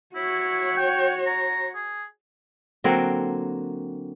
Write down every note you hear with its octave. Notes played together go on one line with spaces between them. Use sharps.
E4 F#4 C#5
G5
A#5
G#4
D3 F#3 A#3 C4